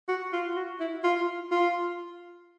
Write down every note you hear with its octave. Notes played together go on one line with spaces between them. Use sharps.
F#4
F4
F#4
E4
F4
F4